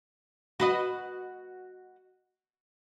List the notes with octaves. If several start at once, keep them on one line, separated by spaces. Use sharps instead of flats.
F#4 B4 D#5